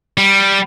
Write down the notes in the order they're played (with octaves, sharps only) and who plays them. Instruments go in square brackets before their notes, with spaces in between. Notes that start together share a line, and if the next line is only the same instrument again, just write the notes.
[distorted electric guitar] G3